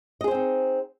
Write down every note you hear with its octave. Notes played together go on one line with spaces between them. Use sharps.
C4 D#4 G#4 C5 D#5